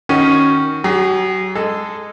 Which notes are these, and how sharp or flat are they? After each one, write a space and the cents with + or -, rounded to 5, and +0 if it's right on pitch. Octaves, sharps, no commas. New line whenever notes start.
D#3 +0 C#4 +0 F#4 +0
F#3 +35 G#4 -25
G#3 -10 A4 +0